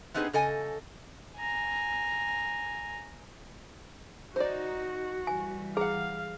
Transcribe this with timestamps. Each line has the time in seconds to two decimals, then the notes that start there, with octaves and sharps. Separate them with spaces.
0.14 B3 C4 D#4 G4 G#4 B4
0.33 C#3 A4 D#5 G#5
1.36 G#5 A#5
4.36 D#4 F#4 C5 D5
5.27 E3 G3 G#5
5.77 G#4 F5 F#5 A#5